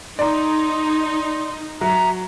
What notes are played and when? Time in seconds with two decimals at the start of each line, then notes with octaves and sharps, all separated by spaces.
0.19 D#4 D5 A#5 C6
1.81 F#3 E5 A#5